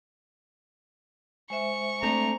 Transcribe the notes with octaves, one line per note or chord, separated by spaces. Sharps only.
G#3 C5 E5 C#6
A3 C4 D4 A#5